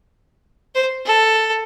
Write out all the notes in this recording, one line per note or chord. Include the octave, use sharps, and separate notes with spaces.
C5
A4